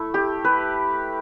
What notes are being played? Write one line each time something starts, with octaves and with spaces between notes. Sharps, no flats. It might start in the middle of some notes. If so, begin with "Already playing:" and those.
Already playing: A3 E4
G4
B4